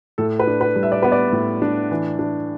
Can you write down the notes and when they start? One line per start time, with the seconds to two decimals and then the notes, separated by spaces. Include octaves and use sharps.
0.18 A2 A4
0.39 B4
0.47 D4
0.61 B4
0.76 G3
0.83 E5
0.92 D5
1.02 B3 B4
1.12 D5
1.33 A2
1.62 D4
1.91 E3
2.19 D4